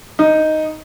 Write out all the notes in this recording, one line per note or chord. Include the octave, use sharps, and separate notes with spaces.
D#4